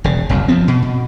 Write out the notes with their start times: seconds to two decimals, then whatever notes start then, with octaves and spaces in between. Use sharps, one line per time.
0.04 E1 C#3
0.29 F#1 C2 F#2
0.48 F3 G3 B3 C4
0.68 B2
0.82 B2